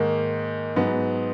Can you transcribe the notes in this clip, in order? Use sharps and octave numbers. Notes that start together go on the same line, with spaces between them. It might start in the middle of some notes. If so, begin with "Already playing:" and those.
Already playing: G#2 D#3 A#3
G#2 F#3 B3